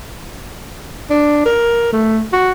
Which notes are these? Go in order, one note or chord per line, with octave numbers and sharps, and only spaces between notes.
D4
A#4
A3
F#4